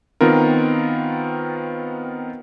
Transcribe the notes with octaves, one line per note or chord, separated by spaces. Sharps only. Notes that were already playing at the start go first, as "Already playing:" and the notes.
D#3 B3 C4 F4 A#4